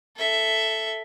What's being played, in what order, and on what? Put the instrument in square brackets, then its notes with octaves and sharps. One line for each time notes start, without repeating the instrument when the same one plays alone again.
[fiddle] A4 E5